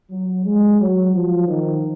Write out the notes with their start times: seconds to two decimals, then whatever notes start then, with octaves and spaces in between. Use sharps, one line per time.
0.10 F#3
0.45 G#3
0.79 F#3
1.13 F3
1.47 D#3